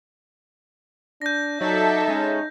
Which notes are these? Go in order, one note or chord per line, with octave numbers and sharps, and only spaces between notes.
D4 G6 A#6
F#3 D#4 A4 D5 E5
G#3 C#4